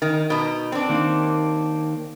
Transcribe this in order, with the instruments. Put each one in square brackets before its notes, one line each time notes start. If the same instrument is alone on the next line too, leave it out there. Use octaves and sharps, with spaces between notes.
[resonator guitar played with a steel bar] D#3
B2 D#4
C4 D4
[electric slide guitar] D#3 A#3